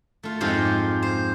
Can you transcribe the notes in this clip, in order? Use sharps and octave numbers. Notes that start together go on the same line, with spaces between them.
A3 F4
F2 G#2 F3 G#3 F4 G4
C5